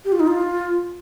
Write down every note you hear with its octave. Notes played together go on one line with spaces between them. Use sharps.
G4
F4
D#4
F4